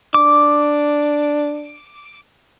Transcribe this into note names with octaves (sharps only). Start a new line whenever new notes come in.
D4 D6